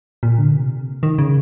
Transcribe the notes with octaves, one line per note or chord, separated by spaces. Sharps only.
A#2
D3
C3
D#3
C#3